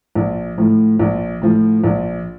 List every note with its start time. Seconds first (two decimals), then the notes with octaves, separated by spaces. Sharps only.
0.15 A#1
0.58 A2 F3
0.99 A#1
1.42 A2 F3
1.84 A#1